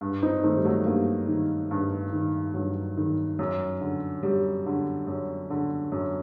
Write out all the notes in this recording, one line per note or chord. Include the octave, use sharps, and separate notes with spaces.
G2
C4 D#4
D#3 A3 C4
G3
F#3 A3
G2 G3 A#3
D#3
G2
D#3
G2 F#3
D#3
F#2
D3
F#2 G3
D3
F#2
D3
F#2